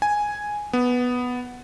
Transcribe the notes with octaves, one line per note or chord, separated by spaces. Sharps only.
G#5
B3